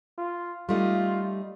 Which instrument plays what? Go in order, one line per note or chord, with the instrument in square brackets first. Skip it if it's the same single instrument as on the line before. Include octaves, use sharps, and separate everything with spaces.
[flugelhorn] F4
[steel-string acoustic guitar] G3 A3 D#4 [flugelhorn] F4